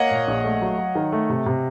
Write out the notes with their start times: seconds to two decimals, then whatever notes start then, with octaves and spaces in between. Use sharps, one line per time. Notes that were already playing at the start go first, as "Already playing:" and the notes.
Already playing: A#3 C#5 D#5 F5 F#5
0.11 A#2
0.28 A#1
0.44 A3
0.62 F#3
0.78 F#3
0.95 D#3
1.12 A3
1.30 C3
1.46 C3